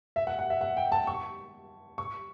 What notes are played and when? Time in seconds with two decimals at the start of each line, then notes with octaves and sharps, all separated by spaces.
0.16 E5
0.27 F#5
0.39 F#5
0.50 E5
0.61 F#5
0.77 G5
0.92 A5
1.07 C#6
1.98 C#6